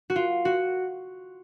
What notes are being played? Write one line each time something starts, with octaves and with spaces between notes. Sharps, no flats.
F#4
F4
F#4